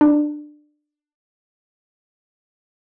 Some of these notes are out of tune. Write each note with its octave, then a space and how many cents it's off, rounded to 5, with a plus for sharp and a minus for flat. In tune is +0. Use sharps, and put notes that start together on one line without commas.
D4 +20